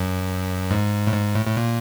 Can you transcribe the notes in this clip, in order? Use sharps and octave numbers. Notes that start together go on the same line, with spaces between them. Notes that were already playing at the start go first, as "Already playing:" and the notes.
Already playing: F#2
G#2
A2
G#2
A2
A2
A#2